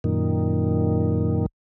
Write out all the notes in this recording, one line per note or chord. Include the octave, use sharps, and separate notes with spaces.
F#2 A#2 D#3